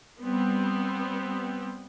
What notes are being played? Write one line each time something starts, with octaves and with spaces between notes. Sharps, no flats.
G3 B3 C4